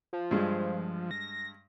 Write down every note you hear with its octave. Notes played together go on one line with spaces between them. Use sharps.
F3
G2 G#3
A#6